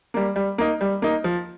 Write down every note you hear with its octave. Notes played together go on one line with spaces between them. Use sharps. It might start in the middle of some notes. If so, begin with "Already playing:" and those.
G3 A#3
G3
A#3 D#4
G3
A#3 D#4
F3